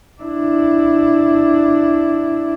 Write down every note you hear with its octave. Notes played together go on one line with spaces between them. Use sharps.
D4 E4